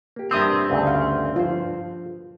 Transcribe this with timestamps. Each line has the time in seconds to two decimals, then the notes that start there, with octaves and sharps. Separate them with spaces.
0.16 A#3 G4
0.31 G2 C4 E5 D#6 E6
0.70 D2 C#3
0.87 F5
1.36 F3 F4 C5